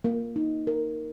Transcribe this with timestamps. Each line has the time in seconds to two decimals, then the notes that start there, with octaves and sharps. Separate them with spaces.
0.04 A#3
0.36 D#4
0.67 A#4